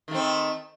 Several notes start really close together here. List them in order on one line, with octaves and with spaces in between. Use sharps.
D#3 A3 C4